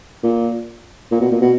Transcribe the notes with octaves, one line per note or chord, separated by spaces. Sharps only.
A#2
A#2
B2
A#2
B2